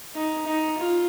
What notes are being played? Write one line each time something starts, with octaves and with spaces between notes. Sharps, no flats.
D#4
D#4
F4